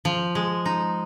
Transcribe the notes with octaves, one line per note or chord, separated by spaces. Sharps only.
F3
G#3
D#4